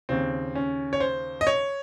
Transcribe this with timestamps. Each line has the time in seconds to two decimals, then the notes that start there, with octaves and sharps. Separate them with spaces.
0.09 D#2 C#3 C4
0.55 C#4
0.93 C#5
1.00 C5
1.41 D#5
1.47 C#5